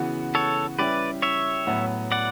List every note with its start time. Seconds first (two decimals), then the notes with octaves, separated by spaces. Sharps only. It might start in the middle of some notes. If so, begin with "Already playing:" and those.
Already playing: C#3 E3 B3 F#4
0.35 A4 C#5
0.78 G3 C#4 E4 G4 B4 D5
1.22 C#5 E5
1.67 A2 F#3 B3
2.12 D5 F#5